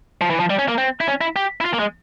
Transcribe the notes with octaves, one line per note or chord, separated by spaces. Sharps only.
F3
E3
F3
G3
C#4
A#3
C4
E4
C#4
E4
G4
E4
F4
A#3
G#3